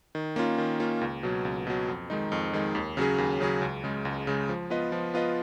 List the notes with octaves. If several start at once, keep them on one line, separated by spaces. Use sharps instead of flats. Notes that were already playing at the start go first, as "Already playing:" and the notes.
D#3
A#3 C#4 F4
D#3
A#3 C#4 F4
C#2
B2 F#3
C#2
B2 F#3
F2
D#3 G#3 D#4
F2
D#3 G#3 D#4
D#2
C#3 F#3 C#4 G#4
D#2
C#3 F#3 C#4 G#4
C#2
C#3 G#3
C#2
C#3 G#3
F3
B3 F4 B4 D#5
F3
B3 F4 B4 D#5